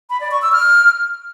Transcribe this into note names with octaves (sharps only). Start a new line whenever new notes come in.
B5
D5
C#6
E6
F6